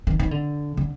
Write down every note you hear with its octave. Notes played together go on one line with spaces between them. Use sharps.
D#3
D#3
D3
D3